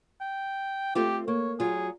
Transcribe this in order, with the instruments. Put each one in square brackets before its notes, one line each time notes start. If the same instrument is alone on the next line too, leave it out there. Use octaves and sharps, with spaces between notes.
[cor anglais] G5
[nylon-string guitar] A3 C4 F4 [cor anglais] G4
[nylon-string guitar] A#3 [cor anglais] C#5
[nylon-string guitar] F#3 F4 [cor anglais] G#4